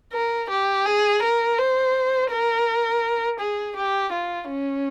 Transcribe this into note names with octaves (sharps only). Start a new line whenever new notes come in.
A#4
G4
G#4
A#4
C5
A#4
G#4
G4
F4
C#4